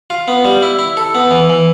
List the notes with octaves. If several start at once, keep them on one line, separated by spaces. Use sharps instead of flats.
F4
B3
G3
E4
E4
A4
B3
E3
E3